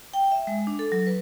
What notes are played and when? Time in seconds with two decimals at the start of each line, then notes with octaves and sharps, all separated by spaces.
0.13 G5
0.32 E5
0.47 G#3
0.67 D4
0.79 A4
0.92 F#3
1.07 B4